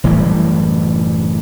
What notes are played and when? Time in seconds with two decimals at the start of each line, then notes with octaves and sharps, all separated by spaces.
0.04 F#1 A2 E3 G3